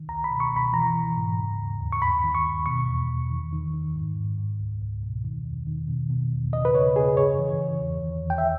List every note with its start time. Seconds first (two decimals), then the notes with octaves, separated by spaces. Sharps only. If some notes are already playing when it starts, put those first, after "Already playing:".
Already playing: D#3
0.08 C#2 A#5
0.24 B5
0.30 B2
0.40 C#6
0.52 B2 B5
0.73 E3 A#5
0.94 E3
1.17 G#2
1.37 C#3
1.59 D#2
1.81 D#2
1.92 C#6
2.02 G2 B5
2.24 D#3
2.35 C#6
2.44 G2
2.66 B2 C#6
2.88 E2
3.09 E2
3.30 D#3
3.53 D#3
3.74 D#3
3.96 G#2
4.16 G#2
4.38 G#2
4.60 C#2
4.81 C#2
5.03 B2
5.24 D#3
5.45 E2
5.67 D#3
5.88 B2
6.10 B2
6.32 E2
6.52 C#3 D#5
6.65 B4
6.75 C#3 C#5
6.96 C#3 G#4
7.17 G2 C#5
7.39 E3
7.60 E3
7.82 E2
8.03 D#3
8.24 E2
8.30 G5
8.38 E5